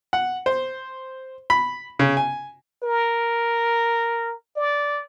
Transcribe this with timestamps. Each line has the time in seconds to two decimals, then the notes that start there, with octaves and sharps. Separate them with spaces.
0.13 F#5
0.46 C5
1.50 B5
1.99 C#3
2.17 G#5
2.83 A#4
4.56 D5